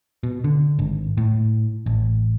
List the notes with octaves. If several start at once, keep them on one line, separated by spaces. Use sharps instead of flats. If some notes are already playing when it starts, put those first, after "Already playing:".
B2
D3
G#1
A2
A1